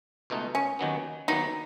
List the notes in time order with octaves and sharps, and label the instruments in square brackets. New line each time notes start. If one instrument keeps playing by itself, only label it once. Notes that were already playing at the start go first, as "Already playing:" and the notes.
[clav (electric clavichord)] C#2 B2 A3 D#4
[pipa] C#4
[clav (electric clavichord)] D#2 D#3 F#3 B3
[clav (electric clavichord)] D#2 D#3 F#3 B3 [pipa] D#4